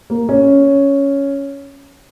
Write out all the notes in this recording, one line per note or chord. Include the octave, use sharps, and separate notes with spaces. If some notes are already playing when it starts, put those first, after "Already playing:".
A#3
C#4